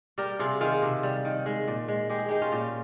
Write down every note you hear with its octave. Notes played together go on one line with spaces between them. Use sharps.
G3 G4 A#4
C3 F4 G#4
D#3 F4 G#4
C3
G3
D#3
G#3
A#2
G#3
G#3 G4
G#4
G#3 D#4 G4
C#4 F4
A#2